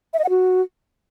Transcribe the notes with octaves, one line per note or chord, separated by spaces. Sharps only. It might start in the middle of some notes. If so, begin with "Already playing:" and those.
E5
D#5
F#5
F#4